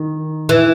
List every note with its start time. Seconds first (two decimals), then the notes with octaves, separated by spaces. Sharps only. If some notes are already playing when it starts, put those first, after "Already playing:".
Already playing: D#3
0.49 E3